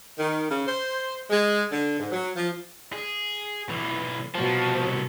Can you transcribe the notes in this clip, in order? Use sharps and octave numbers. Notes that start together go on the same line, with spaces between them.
D#3
C#3
C5
G#3
D3
G#2
F#3
F3
G#4
B1 E3
C2 B2 F3 F#3 A5